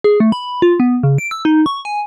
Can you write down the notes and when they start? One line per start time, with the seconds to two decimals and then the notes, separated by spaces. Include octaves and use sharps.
0.04 G#4
0.20 A3
0.32 B5
0.62 F4
0.80 B3
1.03 C#3
1.18 D7
1.31 E6
1.45 D#4
1.66 C#6
1.85 G#5